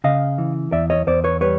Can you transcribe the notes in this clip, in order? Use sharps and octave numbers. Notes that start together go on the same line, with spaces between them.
C#3 D#5 F5
E3
E2 D5 E5
C#5 D#5
E2 C5 D5
B4 C#5
G3 B4 C#5